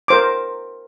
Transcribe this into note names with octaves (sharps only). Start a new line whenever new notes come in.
A#4 C5 D6